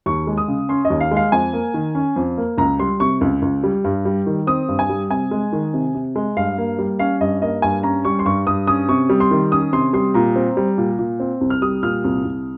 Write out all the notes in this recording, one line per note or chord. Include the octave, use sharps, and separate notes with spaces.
D#2 C#6
G#3
D#6
C#3
C#4 C6
D#5
D#2
F5
G#3
F5
F2 G#5
A#3
D#3
C#4
F2
A#3
C#2 A#5
G3 C6
C3 C#6
C#2
C#2
G3
G2
G3
D#3
C4 D#6
G2
G#5
G3
C3 G#5
G#3
D#3
C3
C3
G#3
G2 F5
A#3
G3
C#4 F5
G2 D#5
A#3 D#5
G2 G#5
C#4 A#5
G3 C#6
C6
G2 C#6
G2 D#6
C#4 D#6
C3 C#6
G3
C6
D#3
C#4 D#6
C3 C6
G3 C6
A#2 A#5
C4
G3
A#2
A#2
C4
C2
F6
G3 D#6
A#2 F6
C2
C2